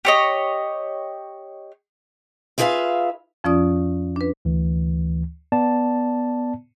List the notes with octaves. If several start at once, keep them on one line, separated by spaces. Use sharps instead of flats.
G4 C#5 D#5
E4 F4 G#4 B4 E5 F5
F2 F3 C#4 F4 D5 D#6
D4 B4
D2 E3
B3 D5 A5